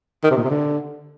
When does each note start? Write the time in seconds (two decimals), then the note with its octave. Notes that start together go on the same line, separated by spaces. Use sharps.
0.24 D#3
0.30 C3
0.37 A#2
0.44 C3
0.50 D3